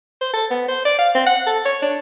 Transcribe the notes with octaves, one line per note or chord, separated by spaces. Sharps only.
C5
A4
B3
C5
D5
F5
C4
F#5
A4
C#5
D4